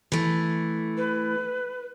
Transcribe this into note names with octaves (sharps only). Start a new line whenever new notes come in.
E3 A3
B4